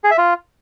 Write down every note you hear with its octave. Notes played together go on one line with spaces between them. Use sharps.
G#4
E5
F4